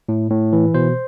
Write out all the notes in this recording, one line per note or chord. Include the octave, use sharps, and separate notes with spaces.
A2
A2
E3
B2 C5